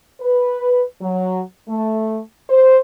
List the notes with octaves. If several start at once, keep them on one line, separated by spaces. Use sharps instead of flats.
B4
F#3
A3
C5